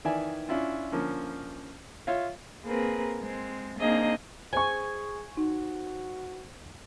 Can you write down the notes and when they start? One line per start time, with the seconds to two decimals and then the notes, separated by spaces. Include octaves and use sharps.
0.05 D#3 E3 D5 E5 G#5
0.49 C#4 D4 E4 F4
0.92 D3 F3 A#3 C#4
2.07 F4 C#5 E5 F5
2.65 A#3 C4 G#4 A#4 B4
3.20 G#3 C4
3.79 A#3 C4 D4 D#4 G#4 D#5
4.53 G#4 C5 G#5 C#6
5.37 D#4 F#4